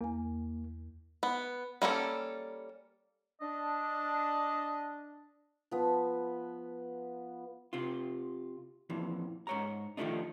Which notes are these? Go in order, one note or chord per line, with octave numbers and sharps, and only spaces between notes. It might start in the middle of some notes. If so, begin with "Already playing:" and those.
E2 A#3 G#5
B3
G3 A#3 C#4 A4
D4 D#5
F3 B3
C3 F4
F2 A#2 E3
G#2 C#5 A#5
D#3 F3 G#3 A3 D4 D#4